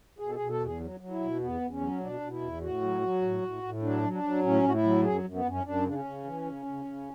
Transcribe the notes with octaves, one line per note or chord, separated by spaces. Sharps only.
B2 G#4
A4
G#4
B2
A4
E2
G#4
F#3
F#3
E4
B2
E2 B3
E2
C#4
F#3
B2 D4
B2
E4
E2
A2 F#4
F#3
F#3
A2
A2
A2
F#3 D4
F#3
D4
F#3
A2 C#4
A2 F#4
E4
F#3
F#2 G#4
F#2
B3
F#2 C#4
F#2 D4
C#3 D4
C#4
C#3
E3
C#3
C#3
C#3